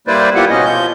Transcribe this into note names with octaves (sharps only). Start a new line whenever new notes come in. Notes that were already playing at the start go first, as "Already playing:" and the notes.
G3 A#3 E4 B4 C5 D5
A#3 B3 E4 F4 G4 F#5
B2 C#4 D#5
F3 G6